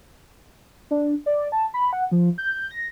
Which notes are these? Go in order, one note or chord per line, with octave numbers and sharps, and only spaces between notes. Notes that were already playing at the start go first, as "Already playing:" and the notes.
D4
D5
A5
B5
F#5
F3
G6
A#6